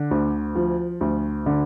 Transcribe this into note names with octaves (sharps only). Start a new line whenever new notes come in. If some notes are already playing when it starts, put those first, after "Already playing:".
Already playing: D3
D2
F3
D2
D3